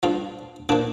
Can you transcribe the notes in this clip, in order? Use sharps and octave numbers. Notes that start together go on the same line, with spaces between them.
G2 F3 F4
A#2 F3 D4